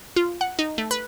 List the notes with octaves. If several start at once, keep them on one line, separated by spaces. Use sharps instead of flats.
F4
F#5
D#4
A3
B4